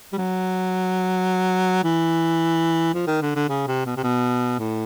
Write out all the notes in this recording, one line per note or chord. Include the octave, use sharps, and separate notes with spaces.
G3
F#3
E3
F3
D#3
D3
D3
C#3
C3
B2
C3
B2
A2